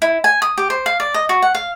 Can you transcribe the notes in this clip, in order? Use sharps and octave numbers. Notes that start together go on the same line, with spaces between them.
E4
G#5
D#6
G4
C5
F5
D5
D#5
F#4
F#5
F5